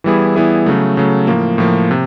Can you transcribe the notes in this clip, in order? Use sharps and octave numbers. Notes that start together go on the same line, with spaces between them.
E3 G3 B3 E4 G#4
E3 G3 B3 E4 G#4
C#3 F#3 A3
C#3 F#3 A3
A2 F3 A#3
A2 F3 A#3
C3